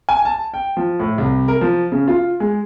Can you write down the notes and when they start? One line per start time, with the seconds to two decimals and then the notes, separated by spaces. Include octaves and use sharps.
0.09 G#5
0.25 A5
0.54 G5
0.77 F3
1.00 A2
1.18 C2
1.48 A#4
1.61 F3
1.92 C#3
2.08 F4
2.40 G#3